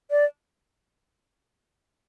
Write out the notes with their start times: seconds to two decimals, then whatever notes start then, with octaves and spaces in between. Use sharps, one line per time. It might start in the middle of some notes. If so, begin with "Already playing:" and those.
0.11 D5